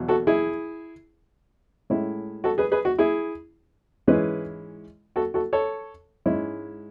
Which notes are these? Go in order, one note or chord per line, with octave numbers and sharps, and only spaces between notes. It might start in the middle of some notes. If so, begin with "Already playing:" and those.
Already playing: E2 B2 F#3
F#4 A4
E4 G#4
A2 G#3 C#4 E4
F#4 A4
G#4 B4
G#4 B4
F#4
E4 G#4
G#2 E3 G#3 C#4 E4 G#4 B4
F#4 A4
F#4 A4
A4 C#5
G#2 G#3 C#4 E4